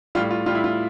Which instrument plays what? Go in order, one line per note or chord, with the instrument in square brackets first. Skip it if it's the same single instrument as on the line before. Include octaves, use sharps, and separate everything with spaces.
[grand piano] A2 G3 F4
F4
A2 G3 F4
E4
F4